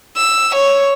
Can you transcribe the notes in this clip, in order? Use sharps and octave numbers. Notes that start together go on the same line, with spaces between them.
E6
C#5